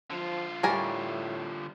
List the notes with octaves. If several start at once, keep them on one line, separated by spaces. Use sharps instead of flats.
D3 F3 F4
A2 G3 A#4 C#5 D5 G#5 A#5